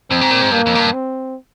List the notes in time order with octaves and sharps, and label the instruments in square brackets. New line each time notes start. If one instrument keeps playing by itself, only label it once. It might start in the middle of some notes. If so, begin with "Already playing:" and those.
[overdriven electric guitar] F2 [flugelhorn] C4
[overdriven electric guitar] G#2
A#2
G#2
[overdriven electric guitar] G2 [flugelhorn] A#3
[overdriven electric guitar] F2
G#2
G2
[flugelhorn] C4